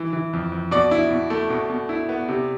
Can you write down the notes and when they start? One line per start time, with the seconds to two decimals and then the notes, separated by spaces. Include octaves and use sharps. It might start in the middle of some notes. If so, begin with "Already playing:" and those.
Already playing: E3
0.13 E3
0.33 F2
0.52 F2
0.71 B2 D5
0.91 E4
1.11 B2
1.30 A3
1.50 B2
1.70 B2
1.89 E4
2.09 B3
2.28 C3